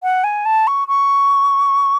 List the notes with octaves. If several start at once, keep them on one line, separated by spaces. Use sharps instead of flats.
F#5
G#5
A5
C#6
C#6